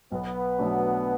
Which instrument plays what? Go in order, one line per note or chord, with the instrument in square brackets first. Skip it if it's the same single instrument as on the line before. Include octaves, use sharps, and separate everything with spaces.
[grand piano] B1 [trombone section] B3
[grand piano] B2 F#3 A3 D4